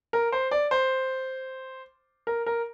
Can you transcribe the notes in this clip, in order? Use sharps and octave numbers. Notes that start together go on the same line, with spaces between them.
A#4
C5
D5
C5
A#4
A#4